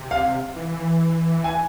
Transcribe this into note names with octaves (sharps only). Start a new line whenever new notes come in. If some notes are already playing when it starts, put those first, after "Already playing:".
Already playing: C3
F5
E3
G#5